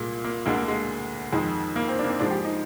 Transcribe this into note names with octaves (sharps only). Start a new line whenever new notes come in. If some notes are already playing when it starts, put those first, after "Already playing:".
Already playing: C2 A#2 G#3 A#3
A#3
D2 D3 G#3 A#3
A#3
G#3
F2 D#3 G#3
A#3
C4
D4
A#3
C4
G#2 F3 G#3 D4
G4
D#4